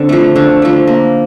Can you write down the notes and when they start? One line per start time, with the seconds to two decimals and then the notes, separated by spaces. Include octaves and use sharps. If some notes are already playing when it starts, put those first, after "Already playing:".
Already playing: D3 C4
0.09 F3 A3
0.36 D3
0.62 F3 A3
0.87 A#3